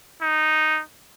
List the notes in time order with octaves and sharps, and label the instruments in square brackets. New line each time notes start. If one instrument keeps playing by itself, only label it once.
[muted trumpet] D#4